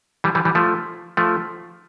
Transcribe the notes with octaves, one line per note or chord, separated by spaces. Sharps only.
E3 G3
E3 G3
E3 G3
F3 A3
F3 A3